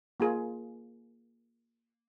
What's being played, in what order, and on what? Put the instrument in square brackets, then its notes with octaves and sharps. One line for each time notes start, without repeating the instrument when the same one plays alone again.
[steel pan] A#3 F4 G#4